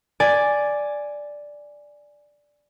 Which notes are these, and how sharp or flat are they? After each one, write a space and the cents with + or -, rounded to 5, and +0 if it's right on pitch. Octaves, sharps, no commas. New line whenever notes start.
D5 +0 G#5 +0